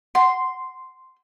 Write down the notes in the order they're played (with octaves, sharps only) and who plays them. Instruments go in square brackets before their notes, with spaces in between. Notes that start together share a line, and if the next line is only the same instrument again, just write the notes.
[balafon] F#5 [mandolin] C6